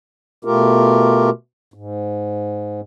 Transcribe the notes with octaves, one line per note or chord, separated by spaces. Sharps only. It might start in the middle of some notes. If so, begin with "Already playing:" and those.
B2 A3 F4 G4 A#4
G#2